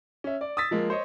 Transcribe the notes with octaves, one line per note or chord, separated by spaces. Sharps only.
C#4 E5
D5
D#6 E6 A6 B6
F3 G#3 A#3
C5 C#5 D#5